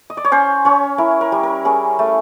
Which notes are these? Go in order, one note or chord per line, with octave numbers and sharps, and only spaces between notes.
D#5
D5
C#5
C#4 C5
C#4 C#5
E4 A#4
A#4
G3
A#4
C#4 G#4
A3